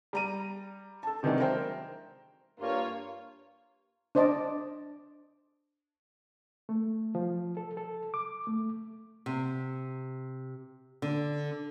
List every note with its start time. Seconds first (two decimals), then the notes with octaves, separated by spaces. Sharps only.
0.13 G3 A#5 D#7
1.03 A4 A5
1.23 C3 D#3 E3 F#3 G#3 D4
1.40 A#4 C5 E5 G5
2.59 G2 A#3 F4 C#5
4.15 D4 C5 D5 D#5 A5 D6
6.69 A3
7.15 F3
7.57 A4
7.77 A4
8.14 D6
8.47 A3
9.26 C3
11.02 D3